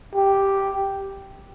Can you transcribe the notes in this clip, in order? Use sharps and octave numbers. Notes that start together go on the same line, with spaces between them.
G4